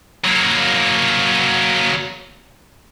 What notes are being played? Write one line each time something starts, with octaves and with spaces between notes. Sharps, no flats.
F#3 A#3